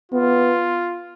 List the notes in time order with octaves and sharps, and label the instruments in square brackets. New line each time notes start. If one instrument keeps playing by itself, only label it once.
[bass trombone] B3 [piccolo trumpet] F4